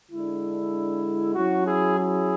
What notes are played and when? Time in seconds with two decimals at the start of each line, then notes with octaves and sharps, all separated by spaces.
0.11 D3 G#3 D4 E4
1.34 F#3 C#4 E4 F#4
1.66 E4 G#4
1.97 E4 G#4